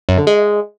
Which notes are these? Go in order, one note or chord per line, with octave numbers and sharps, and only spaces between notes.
F#2
D3
G#3